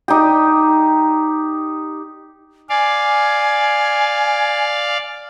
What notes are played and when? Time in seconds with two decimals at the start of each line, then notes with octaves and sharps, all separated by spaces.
0.08 D#4 G4
2.69 D5 F5 G#5